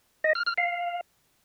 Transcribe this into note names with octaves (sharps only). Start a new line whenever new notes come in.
D#5
F6
F6
F5